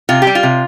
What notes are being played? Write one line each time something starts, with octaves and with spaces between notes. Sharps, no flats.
C3 F4
G4
G3
F4
C3